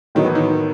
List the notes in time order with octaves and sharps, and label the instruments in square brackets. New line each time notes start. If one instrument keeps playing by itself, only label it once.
[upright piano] A2 F#3 B3 D#4 [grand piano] D#3
[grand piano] E3
D#3